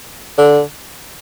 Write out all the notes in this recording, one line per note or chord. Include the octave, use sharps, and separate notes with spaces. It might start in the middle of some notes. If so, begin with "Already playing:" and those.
D3